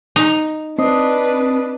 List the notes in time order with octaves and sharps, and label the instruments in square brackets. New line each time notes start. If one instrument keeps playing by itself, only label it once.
[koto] D#4
[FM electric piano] C4 [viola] D4 B4 [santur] D#5